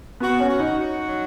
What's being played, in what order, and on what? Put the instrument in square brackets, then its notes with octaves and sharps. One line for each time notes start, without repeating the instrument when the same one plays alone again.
[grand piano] B3 [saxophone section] F#4
[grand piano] C#4
[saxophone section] F#4
[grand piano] D#4
[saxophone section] F#4
F#3